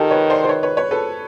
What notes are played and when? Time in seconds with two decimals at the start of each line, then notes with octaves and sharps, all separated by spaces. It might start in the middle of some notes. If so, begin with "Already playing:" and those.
Already playing: D#3 G4 A4
0.11 B4 C#5
0.30 C5 D5
0.44 C5
0.49 B4 C#5
0.63 B4 C#5
0.77 B4 C#5
0.91 A4 B4